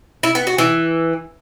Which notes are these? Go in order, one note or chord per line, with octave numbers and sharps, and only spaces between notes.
E4
B3
F#4
E3